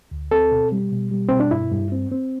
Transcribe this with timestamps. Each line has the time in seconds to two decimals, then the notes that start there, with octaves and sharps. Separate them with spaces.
0.11 D2
0.31 C4 A4
0.52 B2
0.72 G3
0.92 B2
1.11 G3
1.28 B2 C4
1.40 D4
1.51 G2 E4
1.72 G2
1.92 C4
2.12 C4